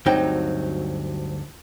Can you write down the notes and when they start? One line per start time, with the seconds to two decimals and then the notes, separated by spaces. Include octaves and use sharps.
0.06 D2 G2 F#3 C4 D#4 G5